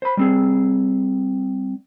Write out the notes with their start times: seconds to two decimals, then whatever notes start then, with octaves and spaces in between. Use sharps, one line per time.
0.02 C5 B5
0.17 G3 C4 G#4